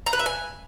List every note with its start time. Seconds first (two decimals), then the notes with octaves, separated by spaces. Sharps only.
0.06 A#5
0.13 B4
0.19 E5
0.26 G#5